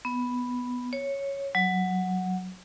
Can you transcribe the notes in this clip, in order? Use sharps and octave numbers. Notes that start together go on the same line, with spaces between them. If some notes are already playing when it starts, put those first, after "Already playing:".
B3
C#5
F#3